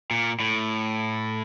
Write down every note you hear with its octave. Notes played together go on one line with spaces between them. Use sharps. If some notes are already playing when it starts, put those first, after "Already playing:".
A#2
A2